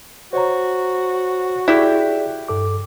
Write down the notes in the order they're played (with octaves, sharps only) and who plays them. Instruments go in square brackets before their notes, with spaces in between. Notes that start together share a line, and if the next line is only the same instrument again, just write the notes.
[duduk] F#4 [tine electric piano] C5 C#5 A#5
[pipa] E4 G4 [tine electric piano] G#4 D5 F#6
[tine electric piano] G2 A4 D6